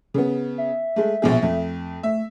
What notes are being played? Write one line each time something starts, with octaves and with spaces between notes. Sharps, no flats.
C#3 B3
E5
G#3 A3
A#1 B2 G#4
F2 A3
A3 E5